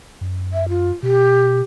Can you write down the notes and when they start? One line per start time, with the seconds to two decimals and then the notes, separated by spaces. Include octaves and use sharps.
0.21 F#2
0.53 E5
0.69 F4
1.03 B2 G4